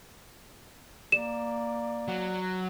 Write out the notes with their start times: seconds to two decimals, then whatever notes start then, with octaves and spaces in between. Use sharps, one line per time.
1.12 A#3 D5 E7
2.08 F#3